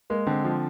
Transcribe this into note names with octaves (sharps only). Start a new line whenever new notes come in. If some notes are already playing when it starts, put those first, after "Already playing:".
G#3 A#3
D3 C4
F3